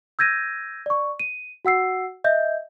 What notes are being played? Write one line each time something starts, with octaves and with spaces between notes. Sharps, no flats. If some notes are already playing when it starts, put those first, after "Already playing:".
E6 G6 G#6 A#6 D#7
D5 C#6
D#7
F#4 F#5 E6 C7
D#5 E5 G6